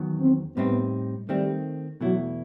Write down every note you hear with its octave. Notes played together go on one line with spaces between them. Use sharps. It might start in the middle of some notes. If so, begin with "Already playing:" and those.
Already playing: E2 D#3 F#3
C4
A2 G3 B3 C4 D#4
D#3 G3 A3 C4
E2 B2 F#3 A3 E4